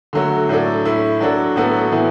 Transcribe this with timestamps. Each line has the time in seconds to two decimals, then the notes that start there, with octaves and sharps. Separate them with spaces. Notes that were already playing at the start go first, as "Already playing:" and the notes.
0.13 D3 F#3 A3 F#4
0.49 A2 F#3 D4 A4
0.85 A2 A3 E4
1.21 F#3 D4 F#4 A4
1.56 A2 F#3 B3 F#4 A4
1.92 A2 E3 B3 E4